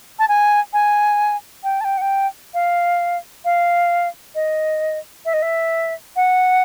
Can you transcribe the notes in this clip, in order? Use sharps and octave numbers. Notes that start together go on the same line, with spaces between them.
A5
G#5
G#5
G5
A5
G5
F#5
G5
F5
F5
D#5
E5
D#5
E5
F#5